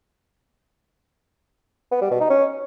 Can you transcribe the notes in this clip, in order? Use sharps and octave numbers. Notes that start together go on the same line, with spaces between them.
B3
G3
B2
D#4
C#4